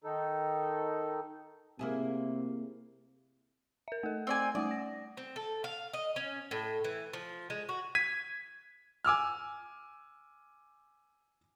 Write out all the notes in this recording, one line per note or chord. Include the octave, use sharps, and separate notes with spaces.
D#3 D#4 A4
C3 A#3 E4 G#4
A#4 E5
A3 A4
C4 D5 G#5
G3 A3 D5 D#6
A#6
C4
A4
F5
D#5
C#4
A2
E3
F3
G#3
F#4
G#6 B6 D#7
G#5 D6 E6 F6